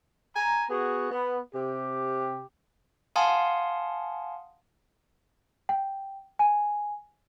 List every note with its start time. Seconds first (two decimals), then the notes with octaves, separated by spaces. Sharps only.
0.36 G#5 A#5
0.69 B3 F#4 G#4
1.11 B3
1.54 C3 G4
3.16 F5 F#5 G#5 A5 C6 D#6
5.69 G5
6.39 G#5